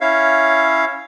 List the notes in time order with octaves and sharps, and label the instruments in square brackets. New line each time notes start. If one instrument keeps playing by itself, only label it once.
[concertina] C#4 E4 C#5 E5 F5